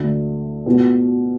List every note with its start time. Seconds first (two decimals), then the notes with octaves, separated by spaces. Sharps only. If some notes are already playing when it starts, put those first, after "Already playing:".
Already playing: D2 D3 A3
0.66 B2 B3 F4